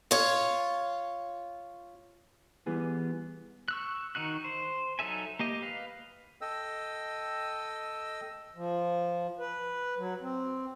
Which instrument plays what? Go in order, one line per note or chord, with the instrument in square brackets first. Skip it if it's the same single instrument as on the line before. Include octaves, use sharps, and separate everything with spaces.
[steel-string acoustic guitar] F4 C#5
[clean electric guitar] E3 G3 B3 G#4
[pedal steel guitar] C#6 E6 F#6
D#3 D#4 F#4 F#6
C5
F#3 D#4 A4 E5 G#5
A#3 G4 D#5
B4 F5
[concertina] A4 D#5 G5 E6
[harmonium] F3
B4
F#3
C4